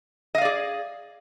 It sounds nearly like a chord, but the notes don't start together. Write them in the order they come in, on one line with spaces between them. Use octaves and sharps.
D#5 F5 D5 G#4